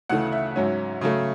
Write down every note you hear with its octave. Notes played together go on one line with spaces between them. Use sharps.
D2 C#3 E3 A3 F#5
E5
G#2 F#3 C#4
C#3 F#3 A3